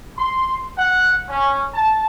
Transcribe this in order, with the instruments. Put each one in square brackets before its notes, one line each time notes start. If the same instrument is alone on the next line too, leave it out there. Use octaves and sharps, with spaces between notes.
[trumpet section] C6
F#5
C#4
A5